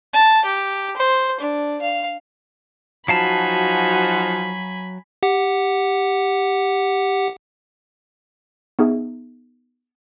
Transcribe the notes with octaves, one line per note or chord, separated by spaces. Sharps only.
A5
G4
C5
D4
F5
F3 F#3 D#4 F#4 F5 G#5 A5 B5
G4 F#5
B3 D#4 G#4 E5